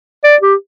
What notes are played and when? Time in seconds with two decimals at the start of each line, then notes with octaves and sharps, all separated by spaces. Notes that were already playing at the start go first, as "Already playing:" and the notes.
0.24 D5
0.42 G4